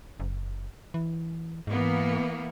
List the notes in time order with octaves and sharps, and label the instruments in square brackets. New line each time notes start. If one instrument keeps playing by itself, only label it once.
[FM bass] F#1
E3
[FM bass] G#2 [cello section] E3 A#3 B3